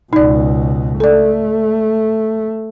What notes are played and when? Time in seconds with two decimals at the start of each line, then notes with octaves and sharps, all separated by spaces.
0.13 C#2 B2 D#4 D5
1.00 A3 A4 D5